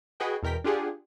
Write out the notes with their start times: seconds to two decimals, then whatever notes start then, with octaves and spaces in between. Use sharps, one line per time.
0.20 F#4 G#4 B4 D#5 F#5 G5
0.42 E2 B2 A#4 G5 B6
0.64 D4 F4 G4 G#4 F#5